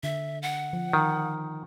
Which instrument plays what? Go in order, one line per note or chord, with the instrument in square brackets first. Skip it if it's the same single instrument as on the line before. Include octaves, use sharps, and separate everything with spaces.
[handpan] D3 [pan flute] E5
[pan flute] F#5
[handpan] F3
[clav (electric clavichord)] D#3